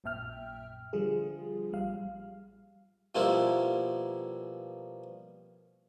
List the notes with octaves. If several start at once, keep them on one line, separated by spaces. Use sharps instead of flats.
A#1 F#2 A#2 E5 G5 F6
D3 F3 G3 F4 G#4
A1 G3 F5
B2 F3 G3 A#3 B3 E4